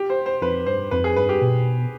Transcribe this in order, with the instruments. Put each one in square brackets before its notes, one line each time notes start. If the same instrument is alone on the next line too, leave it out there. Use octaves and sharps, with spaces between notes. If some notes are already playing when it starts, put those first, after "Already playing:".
Already playing: [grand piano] G4
C5
C5
[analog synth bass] F2 [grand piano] B4
[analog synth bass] G2 [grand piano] C5
[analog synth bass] F2 [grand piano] B4
[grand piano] G#4
[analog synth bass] G2 [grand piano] B4
[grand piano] G4
[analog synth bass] B2